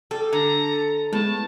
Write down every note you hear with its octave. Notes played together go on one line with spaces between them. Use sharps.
G3 A4
D3 A#5 C#7
A2 G#3 A3 B3 A5